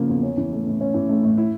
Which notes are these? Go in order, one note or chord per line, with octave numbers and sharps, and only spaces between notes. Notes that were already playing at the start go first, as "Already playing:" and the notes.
Already playing: C#3 F3 A#3
E2
C#4
E3
A3
A2
C#4
E3
A3
A2
E4